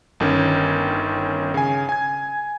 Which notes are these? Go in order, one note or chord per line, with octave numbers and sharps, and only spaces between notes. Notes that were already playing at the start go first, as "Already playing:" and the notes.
G1 D#3 C#4
C#3 G#5
G#5 G#6